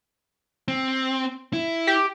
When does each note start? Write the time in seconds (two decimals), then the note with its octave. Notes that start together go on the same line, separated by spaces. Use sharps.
0.68 C4
1.53 E4
1.87 G4